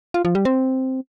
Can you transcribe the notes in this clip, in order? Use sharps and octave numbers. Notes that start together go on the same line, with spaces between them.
F4
F3
G3
C4